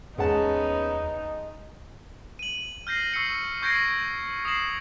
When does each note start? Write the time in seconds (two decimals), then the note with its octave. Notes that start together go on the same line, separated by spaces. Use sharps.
0.18 D#2 G#3 B3 C#4 D#4 F#5 A5
2.39 D#7 F#7
2.87 F6 G6 A#6 C7
3.14 C#6 E6 C7 C#7
3.62 C#6 G6 G#6 A#6 C7 D7
4.45 D#6 A#6 C7 E7 F#7